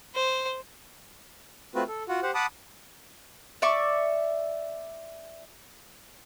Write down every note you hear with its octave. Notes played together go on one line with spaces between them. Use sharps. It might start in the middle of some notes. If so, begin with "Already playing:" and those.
C5
A3 C4 F4 F#4 B4
A4
F4 F#4 F#5
G4 C5 F#5
F#5 A5 B5 D6 D#6
D5 E5 C#6 D6